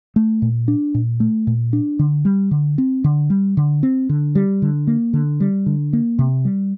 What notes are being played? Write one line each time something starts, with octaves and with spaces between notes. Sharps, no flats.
A3
A#2
D4
A#2
A3
A#2
D4
D3
G3
D3
C4
D3
G3
D3
C4
D3
G3
D3
A#3
D3
G3
D3
A#3
C3
G3